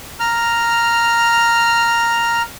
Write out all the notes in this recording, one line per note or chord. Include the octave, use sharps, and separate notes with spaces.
A#5 F6